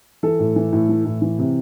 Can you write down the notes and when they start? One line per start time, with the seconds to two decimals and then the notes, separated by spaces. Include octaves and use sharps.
0.23 E3 A4
0.39 A2
0.56 E3
0.73 A2
0.89 E3
1.05 A2
1.22 E3
1.39 C3